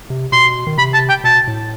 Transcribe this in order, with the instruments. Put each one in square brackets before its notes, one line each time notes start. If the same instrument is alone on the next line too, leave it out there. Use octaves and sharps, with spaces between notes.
[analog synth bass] C3
[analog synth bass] B2 [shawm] C6
[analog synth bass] D#3
[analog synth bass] C3 [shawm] B5
[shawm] A5
G5
[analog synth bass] B2 [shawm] A5
[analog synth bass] A2